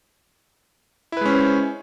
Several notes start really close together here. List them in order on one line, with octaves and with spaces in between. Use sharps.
E4 B4 G#3 C#4 C5